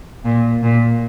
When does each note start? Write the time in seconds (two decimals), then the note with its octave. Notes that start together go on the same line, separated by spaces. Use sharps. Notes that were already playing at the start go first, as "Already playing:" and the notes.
0.25 A#2
0.63 A#2